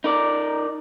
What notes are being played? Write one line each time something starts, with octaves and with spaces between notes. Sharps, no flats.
D#4 A#4 D5